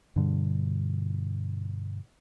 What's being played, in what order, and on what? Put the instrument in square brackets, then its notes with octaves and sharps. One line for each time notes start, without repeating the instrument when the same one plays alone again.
[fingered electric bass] G2 B2 D3 G3